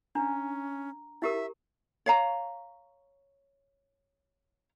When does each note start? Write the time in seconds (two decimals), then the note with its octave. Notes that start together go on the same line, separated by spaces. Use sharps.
0.15 C#4 D4 A#5
1.22 E4 G4 A#4 E5
2.06 C#5 F5 A#5